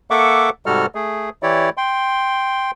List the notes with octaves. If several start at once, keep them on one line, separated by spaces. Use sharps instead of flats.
A#3 A4 E5 F#5 C#6 D6
G#2 C3 G3 F#4 A4 F6
A3 G#4
E3 E4 G4 C#5 D5
G5 C6